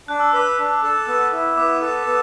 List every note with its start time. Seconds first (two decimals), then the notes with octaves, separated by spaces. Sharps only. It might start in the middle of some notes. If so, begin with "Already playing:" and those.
0.08 D4 F#6
0.20 E6
0.32 B4 D6
0.44 E6
0.58 D4
0.83 A4
1.08 B3
1.32 E4
1.57 B3 D6
1.82 A4
2.07 B3